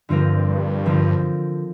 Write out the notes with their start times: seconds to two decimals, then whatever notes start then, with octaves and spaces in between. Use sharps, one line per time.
0.09 G2 D3 F3 C4 F4 A#4
0.86 D3 F3 C4 F4 A#4